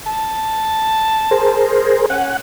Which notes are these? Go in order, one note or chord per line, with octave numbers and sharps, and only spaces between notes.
A5
G#4 A#4 C5
C#4 F#5